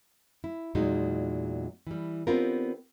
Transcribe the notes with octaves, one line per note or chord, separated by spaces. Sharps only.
E4
E2 A#2 F#3 G#3 D#4
E3 G3
B3 C4 D4 F4 G4 A#4